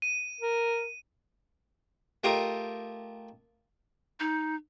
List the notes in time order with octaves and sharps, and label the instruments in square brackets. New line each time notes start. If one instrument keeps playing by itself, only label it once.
[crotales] D#7
[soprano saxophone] A#4
[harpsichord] A3 F4 G4 A#4 D#5
[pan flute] D#4